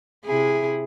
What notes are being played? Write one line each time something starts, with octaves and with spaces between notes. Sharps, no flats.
C3 E4 G#4